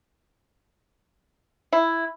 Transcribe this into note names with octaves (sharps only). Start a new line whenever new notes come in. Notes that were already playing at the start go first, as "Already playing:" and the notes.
E4